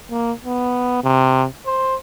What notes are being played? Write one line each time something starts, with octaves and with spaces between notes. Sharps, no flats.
A#3
B3
C3
C5